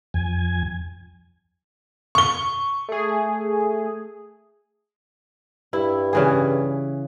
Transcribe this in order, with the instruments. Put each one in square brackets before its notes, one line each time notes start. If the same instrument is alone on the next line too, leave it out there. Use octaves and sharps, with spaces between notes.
[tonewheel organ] F2 G#5
[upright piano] C#6 G7
[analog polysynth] A3 G#4
[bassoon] G2 [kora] E4
[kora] C#3 E3 G#4